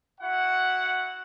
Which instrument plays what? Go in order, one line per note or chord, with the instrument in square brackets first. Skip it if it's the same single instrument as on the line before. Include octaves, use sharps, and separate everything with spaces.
[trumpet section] E4 F#4 F#5